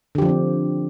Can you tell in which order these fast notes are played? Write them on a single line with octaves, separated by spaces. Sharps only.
D3 G4 F3 D4 C4